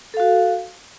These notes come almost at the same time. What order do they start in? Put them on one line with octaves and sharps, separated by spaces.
A4 F5 F#4